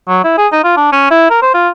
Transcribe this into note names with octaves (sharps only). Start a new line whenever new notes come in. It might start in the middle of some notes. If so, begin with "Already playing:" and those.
F#3
E4
G#4
D#4
F4
D4
C#4
E4
A#4
C5
F4